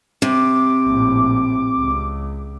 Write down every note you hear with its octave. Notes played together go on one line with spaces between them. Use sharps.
C3 D6
A#1 A2
C#2